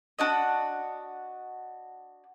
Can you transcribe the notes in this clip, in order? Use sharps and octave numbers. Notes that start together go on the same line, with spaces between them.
D4 F#4 D#5